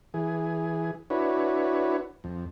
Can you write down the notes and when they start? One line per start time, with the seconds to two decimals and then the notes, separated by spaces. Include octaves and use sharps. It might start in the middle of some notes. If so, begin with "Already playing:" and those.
0.14 E3 G#4
1.10 D4 E4 F#4 B4 C#5
2.24 F2